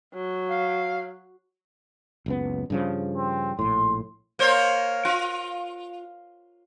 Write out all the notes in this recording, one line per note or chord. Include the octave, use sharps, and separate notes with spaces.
F#3
F5
F#1 C#2 B3
G2 C#3 F3
C4
A#1 A2 C6
A#3 C5 C#5
F4